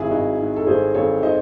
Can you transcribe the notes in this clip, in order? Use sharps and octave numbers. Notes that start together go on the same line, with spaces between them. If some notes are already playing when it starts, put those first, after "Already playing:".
Already playing: G#1 E4 G#4
G#1 D#4 F#4
G#2
A4
G#1 G#4 C5
G#1 A4 C#5
D#3 C5 D#5